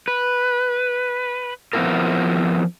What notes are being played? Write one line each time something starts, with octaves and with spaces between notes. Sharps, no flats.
B4
F3 B3 C4 E4 F4 A#4